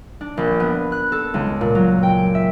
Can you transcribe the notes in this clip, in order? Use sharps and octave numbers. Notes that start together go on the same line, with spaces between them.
D4
A#1
B3
F#6
A4
C#2
A#2
F#3
G5
E5